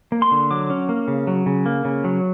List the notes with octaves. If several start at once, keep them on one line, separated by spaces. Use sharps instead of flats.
A#3
C6
D3
F#3 D6
C#4
A#3
C#3
F#3
C#3
A#3
C#3
F#3